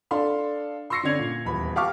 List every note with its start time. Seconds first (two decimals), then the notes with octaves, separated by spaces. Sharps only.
0.11 D4 A4 F5 C6
0.90 C6 C#6 E6 A#6 C7 C#7
1.03 D3 C4 C#4 D5 G#6 F7
1.19 A#2
1.45 D#1 E2 B5
1.76 G4 F5 A5 C#6 D6 F6